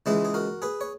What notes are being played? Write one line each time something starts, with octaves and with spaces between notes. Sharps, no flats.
C#2 C#3 E3 G#3 E4 G#4
G#4
F#4 A#4
G#4 B4
C#5